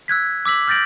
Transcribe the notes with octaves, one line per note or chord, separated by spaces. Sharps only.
E6 F#6 G#6 B6
D6 E6 B6 F#7
F6 G6 A6 A#6 D7 F#7